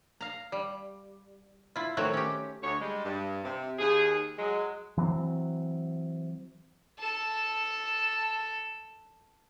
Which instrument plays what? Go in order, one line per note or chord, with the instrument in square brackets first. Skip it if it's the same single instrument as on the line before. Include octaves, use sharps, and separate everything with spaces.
[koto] F5 A#5
G3
E4 F4
D#3 F#3 A3 C4 F#4 C#5
C#4 G4
[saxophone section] D2 C#5
G3 G#3
G2
C3
D#2 G#4
F#3 G#3
[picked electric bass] E3 F#3 A#3 C4
[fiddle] A4 A5